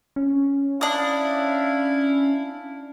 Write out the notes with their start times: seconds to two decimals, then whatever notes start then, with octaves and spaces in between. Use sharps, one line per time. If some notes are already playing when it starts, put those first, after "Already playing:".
0.16 C#4
0.81 D4 E4 F5 D#6